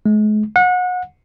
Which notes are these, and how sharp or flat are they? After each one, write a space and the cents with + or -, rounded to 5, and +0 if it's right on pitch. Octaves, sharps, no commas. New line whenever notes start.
G#3 +40
F#5 -30